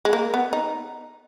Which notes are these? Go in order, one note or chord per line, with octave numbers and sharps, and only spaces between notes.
G#3
A#3
B3
D#4